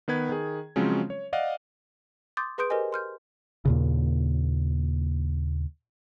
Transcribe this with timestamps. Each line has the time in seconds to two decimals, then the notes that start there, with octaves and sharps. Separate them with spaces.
0.08 D#3 B3 B4 G#6
0.29 D#3 G#4
0.76 C#3 F3 F#3 G#3 C4 C#4
1.10 C#5
1.33 D5 D#5 F5 F#5
2.37 C6 D6 D#6 G6 A6
2.58 G#4 B4 C6 D#6 G6 D7
2.70 G4 A#4 C5 D#5 G#5
2.92 C6 F6 G6
3.65 D#2 A#2 C#3